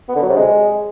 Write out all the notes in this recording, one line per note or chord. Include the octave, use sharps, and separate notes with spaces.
B3
D3
F#3
C3
G#3